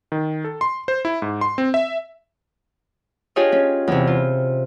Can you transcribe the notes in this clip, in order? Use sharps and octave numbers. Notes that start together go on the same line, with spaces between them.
D#3
A4
C6
C5
E4
G#2
C6
C4
E5
D4 F4 G4 G#4 C#5 D#5
C#4
E2 C3
F4